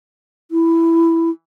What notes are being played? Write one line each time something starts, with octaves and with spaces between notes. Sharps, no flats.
E4